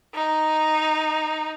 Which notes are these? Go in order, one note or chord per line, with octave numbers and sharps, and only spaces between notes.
D#4